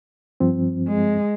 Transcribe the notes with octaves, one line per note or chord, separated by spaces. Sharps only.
G2 F3 C4
G#3